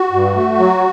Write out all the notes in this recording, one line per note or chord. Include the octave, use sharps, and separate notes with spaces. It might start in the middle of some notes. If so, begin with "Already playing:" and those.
Already playing: F#4
G2
A3
F#3